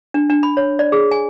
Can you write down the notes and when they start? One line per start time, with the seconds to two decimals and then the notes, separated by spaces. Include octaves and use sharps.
0.14 D4
0.30 D4
0.43 B5
0.57 C#5
0.79 D5
0.92 G#4
1.11 G#5